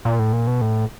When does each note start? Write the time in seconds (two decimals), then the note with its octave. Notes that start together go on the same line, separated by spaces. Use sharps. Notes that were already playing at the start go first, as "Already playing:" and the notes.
0.05 A#2
0.19 A2
0.33 A#2
0.47 B2
0.61 A2